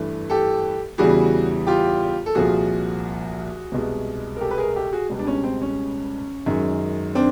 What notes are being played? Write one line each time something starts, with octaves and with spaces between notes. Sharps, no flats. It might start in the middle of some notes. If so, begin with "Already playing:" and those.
Already playing: G2 E3 A3
G4 A4
E2 C#3 E3 G3 F#4 G#4
F4 G4
A4
C2 A#2 F3 F#4 G#4
C2 B2 G#3
A#4
G4 A4
B4
G#4 A#4
G4 A4
F#4 G#4
C#2 B2 G3
D4
C#4
C4
C#4
F#2 D#3 G#3
C4 D4